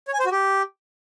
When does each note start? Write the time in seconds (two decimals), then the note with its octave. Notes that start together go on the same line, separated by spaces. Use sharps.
0.08 C#5
0.14 G#5
0.20 C5
0.25 F#4
0.31 G4